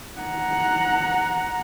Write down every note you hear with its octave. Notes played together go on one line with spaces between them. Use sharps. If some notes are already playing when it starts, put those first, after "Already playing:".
F#5 A#5